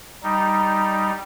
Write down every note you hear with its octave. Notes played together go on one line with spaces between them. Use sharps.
G3 D#4